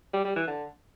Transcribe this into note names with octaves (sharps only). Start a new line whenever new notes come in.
G3
G3
E3
D3